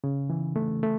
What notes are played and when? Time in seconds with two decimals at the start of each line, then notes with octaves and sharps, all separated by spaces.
0.04 C#3
0.30 E3
0.56 A3
0.83 A3